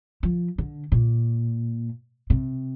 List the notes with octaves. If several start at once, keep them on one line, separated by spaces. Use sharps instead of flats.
F3
D3
A#2
C3